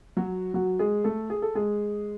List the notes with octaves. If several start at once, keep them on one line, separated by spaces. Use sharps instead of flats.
F#3 F#4
F#3 F#4
G#3 G#4
A3 A4
G#4
A4
G#3 G#4